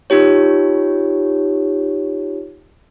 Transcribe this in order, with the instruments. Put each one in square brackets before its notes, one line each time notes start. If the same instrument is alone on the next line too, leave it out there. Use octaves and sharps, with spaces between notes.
[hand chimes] D#4 F4 G4 C#5